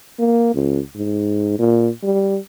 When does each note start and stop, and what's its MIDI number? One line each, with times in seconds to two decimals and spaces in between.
0.19 0.54 58
0.54 0.79 37
0.96 1.57 44
1.59 1.89 46
2.04 2.38 55